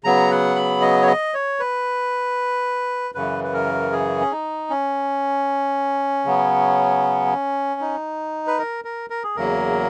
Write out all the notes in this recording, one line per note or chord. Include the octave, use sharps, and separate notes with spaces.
C#3 F#3 B3 A#5
F#5
B5
D#5
C#5
D#5
C#5
B4
F#2 C#3 E3 B4
B4
A#4
G#4
C#4
D#4
C#4
C#3 F#3 B3
D#4
B4
A#4
A#4
A#4
G#4
E2 C#3 F#3 A#3 A#4